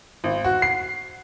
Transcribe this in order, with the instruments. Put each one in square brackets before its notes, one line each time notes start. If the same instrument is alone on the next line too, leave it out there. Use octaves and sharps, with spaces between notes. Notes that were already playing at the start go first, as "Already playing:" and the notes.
[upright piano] G#1
F#4
C7